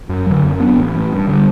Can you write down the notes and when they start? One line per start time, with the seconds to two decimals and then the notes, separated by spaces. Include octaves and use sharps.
0.09 F#2
0.26 D3 F#3
0.43 F#2
0.60 F#3 B3 D4
0.77 A1
0.94 A2 E3
1.12 G2
1.28 D3 G3